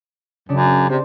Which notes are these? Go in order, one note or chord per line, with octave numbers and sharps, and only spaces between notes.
F#2 C#3 D4
C3 C5 D5